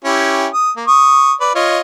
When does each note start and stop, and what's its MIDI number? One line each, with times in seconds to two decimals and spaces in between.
0.05 0.47 61
0.05 0.47 64
0.05 0.47 67
0.54 0.71 87
0.76 0.84 58
0.87 1.33 85
0.87 1.33 87
1.40 1.52 71
1.40 1.52 74
1.55 1.81 65
1.55 1.81 73
1.55 1.81 75